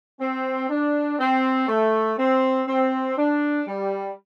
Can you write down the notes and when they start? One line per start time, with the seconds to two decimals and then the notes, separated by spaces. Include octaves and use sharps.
0.19 C4
0.69 D4
1.18 C4
1.68 A3
2.17 C4
2.67 C4
3.17 D4
3.66 G3